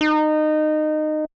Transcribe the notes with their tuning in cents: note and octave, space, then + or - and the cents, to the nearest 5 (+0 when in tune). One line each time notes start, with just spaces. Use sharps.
D#4 -20